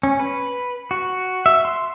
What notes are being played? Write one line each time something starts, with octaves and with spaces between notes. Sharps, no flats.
C#4
B4
F#4
E5
C6